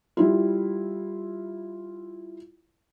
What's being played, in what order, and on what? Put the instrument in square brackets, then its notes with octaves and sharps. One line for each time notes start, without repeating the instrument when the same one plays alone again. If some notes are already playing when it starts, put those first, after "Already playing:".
[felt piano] G3 E4 F4